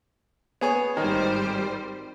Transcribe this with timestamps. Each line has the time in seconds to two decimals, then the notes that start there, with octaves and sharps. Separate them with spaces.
0.61 B3 G#4 C#5
0.97 G#1 D#3 G3 C5